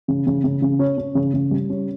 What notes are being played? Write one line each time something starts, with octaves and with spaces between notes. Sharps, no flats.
C#3
C#3
C#3
C#3
C#4
C#4
C#3
C#3
G3
C#4